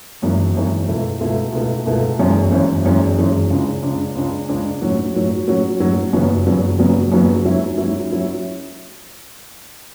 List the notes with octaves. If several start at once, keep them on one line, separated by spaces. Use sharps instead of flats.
G#1 F#2 E3
G#1 F#2 E3
C#2 B2 A3 E4
C#2 B2 A3 E4
C#2 B2 A3 E4
C#2 B2 A3 E4
G#1 F#2 E3 G#3 C#4
G#1 F#2 E3 G#3 C#4
G#1 F#2 E3 G#3 C#4
G#1 F#2 E3 G#3 C#4
C#2 C#3 G#3 D4
C#2 C#3 G#3 D4
C#2 C#3 G#3 D4
C#2 C#3 G#3 D4
A2 F#3 C#4 F#4
A2 F#3 C#4 F#4
A2 F#3 C#4 F#4
A2 F#3 C#4 F#4
F#1 F#2 C#3 F#3 B3
F#1 F#2 C#3 F#3 B3
F#1 F#2 C#3 F#3 B3
F#1 F#2 C#3 F#3 B3
G#2 F#3 C#4 E4
G#2 F#3 C#4 E4
F#3 C#4 E4